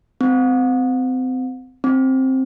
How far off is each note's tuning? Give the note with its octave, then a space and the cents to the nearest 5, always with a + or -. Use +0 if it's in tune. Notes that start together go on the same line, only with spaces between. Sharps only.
C4 -30
C4 +10